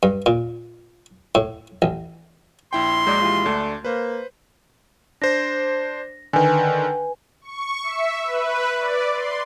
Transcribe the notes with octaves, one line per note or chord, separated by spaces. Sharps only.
G2
A#2
A2
A1
A#1 E4 G5 C6
A#1 F#3 G#3 D5 G6
E3 G3 F4
D2 A3 D4
A#3 B4 C5
D4 C5 A#6
D3 D#3 B4 G#5
C#6
E5
B4
D5
C6